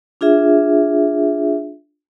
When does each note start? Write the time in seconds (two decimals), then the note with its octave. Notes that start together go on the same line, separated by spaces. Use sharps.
0.21 D4 F4 G#4 E5